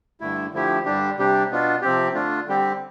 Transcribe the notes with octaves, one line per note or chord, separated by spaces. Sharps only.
G2 D3 A3 E4
D3 F3 A3 E4 G4
G2 D3 G3 D4 G4
C3 G3 D4 G4
B2 B3 D4 F4
C3 F3 C4 G4
D3 A3 D4 F4
D3 G3 C4 G4